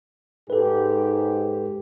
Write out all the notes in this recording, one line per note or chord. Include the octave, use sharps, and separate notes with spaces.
G#2 G4 A4 B4